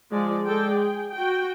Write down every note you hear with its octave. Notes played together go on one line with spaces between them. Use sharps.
F3 G#3 D5
G#3 A4 D5 G5
G#4 G5
F#4 G5